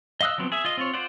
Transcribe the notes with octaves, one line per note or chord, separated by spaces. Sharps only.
D#5 F5 D#6 E6 F#6
F3 F#3 B3 C4
G#4 E5
F4 D#5
C4 F4 C#5
F4 C5 D5 F#5